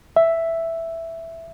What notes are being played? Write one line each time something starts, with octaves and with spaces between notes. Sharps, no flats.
E5